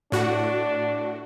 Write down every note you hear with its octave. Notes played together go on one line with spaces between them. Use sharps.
A2 D4 F#4